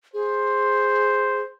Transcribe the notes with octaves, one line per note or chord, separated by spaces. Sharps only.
G#4 C5